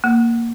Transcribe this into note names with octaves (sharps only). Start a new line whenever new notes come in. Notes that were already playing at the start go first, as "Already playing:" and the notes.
A#3